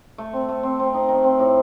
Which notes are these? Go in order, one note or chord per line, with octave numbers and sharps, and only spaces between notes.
A3
C4
A3
C4
C4
D#4
D#3
C4
A2